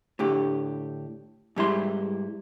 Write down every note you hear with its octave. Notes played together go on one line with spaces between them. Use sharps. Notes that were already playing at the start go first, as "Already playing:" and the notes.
A2 D3 G4
G#2 G3 E4 C6